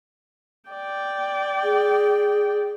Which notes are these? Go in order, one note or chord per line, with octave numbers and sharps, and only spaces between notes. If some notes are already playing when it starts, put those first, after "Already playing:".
D5 G5
G#4